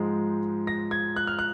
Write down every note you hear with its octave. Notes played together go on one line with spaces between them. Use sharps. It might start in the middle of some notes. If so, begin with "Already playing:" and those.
Already playing: G#2 F3 G#3
A#6
G#6
F#6
F6
F#6